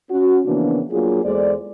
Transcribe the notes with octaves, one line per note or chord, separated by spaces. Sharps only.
C#4 F#4
C#3 E3 F3 A#3 B3 D4
F#3 A#3 D4 F4 G#4
E2 G#3 A4 C5 D5